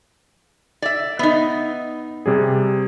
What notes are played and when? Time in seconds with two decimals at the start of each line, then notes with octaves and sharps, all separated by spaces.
0.82 D5 E5
1.19 B3 D#4 E5
2.26 C3 G3 G#4